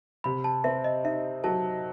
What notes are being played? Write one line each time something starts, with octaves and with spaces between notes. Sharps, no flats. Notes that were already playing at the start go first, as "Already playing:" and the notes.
C3 B5
A5
C4 E5
D#5
D#4 E5
F#3 A5